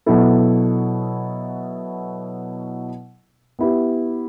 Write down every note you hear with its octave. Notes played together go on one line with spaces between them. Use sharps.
B2 F#3 B3 E4 A4
B3 E4 G4